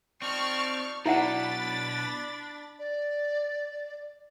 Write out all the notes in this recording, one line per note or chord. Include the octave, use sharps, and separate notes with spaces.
F3 C4 D#4 D5 C#6 F6 A6
B2 F#3 D4 E4 E5 F#5 B5 A6
D5